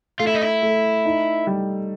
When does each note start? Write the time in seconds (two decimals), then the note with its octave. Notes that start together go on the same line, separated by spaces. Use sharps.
0.19 A3 F4
0.27 E4
0.35 D#4
0.42 E4
0.62 A3
1.05 D#4
1.47 G3